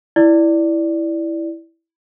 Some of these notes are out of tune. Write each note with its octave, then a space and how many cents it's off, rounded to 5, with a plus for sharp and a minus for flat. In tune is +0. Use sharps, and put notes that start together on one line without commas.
E4 +0 D5 +0